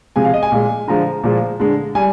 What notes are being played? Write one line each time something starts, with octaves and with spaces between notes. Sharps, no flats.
C3 F3 G#3 G#5
F5
D#5
G#5
A#2 G#3
D3 F3 G#3 A#5
A#2 F3 G#3
D3 G#3
G3 G#5